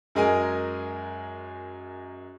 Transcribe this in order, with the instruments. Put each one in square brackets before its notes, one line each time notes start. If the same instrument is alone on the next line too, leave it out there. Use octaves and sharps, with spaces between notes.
[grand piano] F#2 G#3 A#4 G#5